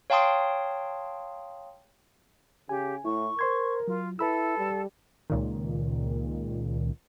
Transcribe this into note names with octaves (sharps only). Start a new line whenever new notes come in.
C#5 F5 G5 A5 C6 D#6
C#3 G4 G#5
A2 E4 C#6
A#4 C5 C6 G#6
F#3 F4
E4 A4 B4 B5 E6
G3
C#2 A#2 D#3